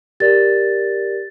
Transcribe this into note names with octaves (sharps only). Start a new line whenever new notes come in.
G4 A#4 D5 A6